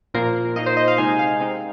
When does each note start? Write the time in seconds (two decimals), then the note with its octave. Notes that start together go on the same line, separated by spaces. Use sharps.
0.14 A#2 F3 A#3 A#4
0.56 A#2 A#3 D#4 D#5
0.66 C5
0.77 D#5
0.88 F5
0.98 C3 G#3 D#4 G#5
1.19 F5
1.40 C3 G#3 C4 D#4